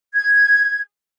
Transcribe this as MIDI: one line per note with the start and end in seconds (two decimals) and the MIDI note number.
0.15 0.81 92